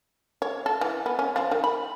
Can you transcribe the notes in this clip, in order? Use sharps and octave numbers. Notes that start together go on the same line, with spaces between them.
C#5
A4
E3
B3
C#4
F3
D#3
B5